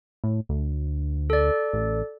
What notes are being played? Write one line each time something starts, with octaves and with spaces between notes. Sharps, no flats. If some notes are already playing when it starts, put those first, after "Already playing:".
A2
D2
A4 D5
A1